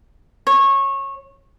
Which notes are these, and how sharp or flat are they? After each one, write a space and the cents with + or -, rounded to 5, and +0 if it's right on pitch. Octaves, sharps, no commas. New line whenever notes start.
C#5 -20